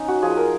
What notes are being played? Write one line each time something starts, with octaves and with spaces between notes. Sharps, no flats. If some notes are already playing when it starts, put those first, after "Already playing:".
Already playing: C#4 D#4
F#4
F3 G#4
C5
A#4